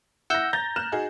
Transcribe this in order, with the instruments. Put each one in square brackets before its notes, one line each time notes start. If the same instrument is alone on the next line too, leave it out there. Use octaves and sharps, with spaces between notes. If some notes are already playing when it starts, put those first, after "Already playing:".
[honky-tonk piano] E4 A#6 [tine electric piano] F#5 E6 G6
[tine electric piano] A#5 [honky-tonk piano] G6 A6 A#6
[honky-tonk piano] F6 F#6 E7
D#4 F#4 G#4